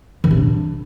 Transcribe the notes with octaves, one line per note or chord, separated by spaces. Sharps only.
D#3
C3
D4